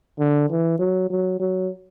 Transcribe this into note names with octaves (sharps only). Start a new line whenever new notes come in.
D3
E3
F#3
F#3
F#3